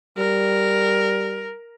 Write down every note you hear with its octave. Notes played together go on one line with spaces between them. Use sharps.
G3 A#4